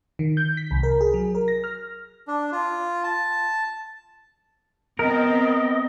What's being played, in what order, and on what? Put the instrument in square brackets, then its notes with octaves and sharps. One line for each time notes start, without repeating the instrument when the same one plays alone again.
[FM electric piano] D#3
G6
B6
C2
A#4
G#4
F#3
A#4
A#6
F6
[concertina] D4
F4
A5
[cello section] B3 C4 [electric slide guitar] A#4 [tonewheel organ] D#5